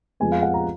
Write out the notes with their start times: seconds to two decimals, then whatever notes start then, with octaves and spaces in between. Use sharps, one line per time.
0.20 F2 F3 G#3 B3 G#5
0.32 F5
0.43 F#5
0.54 A#5